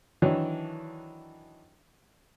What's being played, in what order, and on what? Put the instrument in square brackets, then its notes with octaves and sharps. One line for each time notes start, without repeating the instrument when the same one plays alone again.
[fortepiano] D#3 E3 F#3 D4 C#5